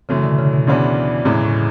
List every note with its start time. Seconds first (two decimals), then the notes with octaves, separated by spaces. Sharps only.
0.09 F#2 C#3 E3 A3
0.23 B2 D3
0.39 C#3
0.53 B2
0.67 D2 C#3 E3 B3 D4
1.25 E2 A2 C#3 E3 G#3
1.45 A2